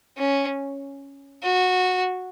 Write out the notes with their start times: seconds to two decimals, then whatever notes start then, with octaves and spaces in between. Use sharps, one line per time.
0.17 C#4
1.43 F#4